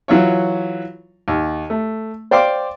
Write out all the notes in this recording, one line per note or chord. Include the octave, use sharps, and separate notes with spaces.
E3 F#3 F4 C#5
D#2
A3
C5 D5 F5 G5 C6 D6